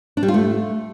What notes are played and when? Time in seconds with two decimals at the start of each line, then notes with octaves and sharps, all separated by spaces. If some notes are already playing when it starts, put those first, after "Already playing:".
0.17 D4
0.23 G3
0.28 F4
0.34 A3